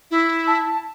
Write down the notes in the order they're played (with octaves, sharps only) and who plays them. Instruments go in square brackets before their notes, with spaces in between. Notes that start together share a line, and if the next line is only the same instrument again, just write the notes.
[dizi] E4
[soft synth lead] A5